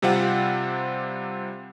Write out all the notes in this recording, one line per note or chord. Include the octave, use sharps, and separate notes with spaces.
C3 G3 C4 F4 F#5